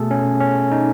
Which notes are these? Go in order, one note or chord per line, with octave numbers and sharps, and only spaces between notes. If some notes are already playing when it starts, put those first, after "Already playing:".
Already playing: B2 A3 G#4 A4
C#4
C#4
D#4